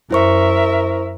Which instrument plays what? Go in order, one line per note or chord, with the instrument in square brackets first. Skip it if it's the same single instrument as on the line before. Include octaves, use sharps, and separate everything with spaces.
[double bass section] F#2 [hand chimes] E4 C5 C#6 [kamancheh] A#4 E5